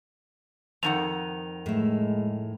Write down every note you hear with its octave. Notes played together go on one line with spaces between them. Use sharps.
F2 D#3 F#5 F7
A2 G#3 E4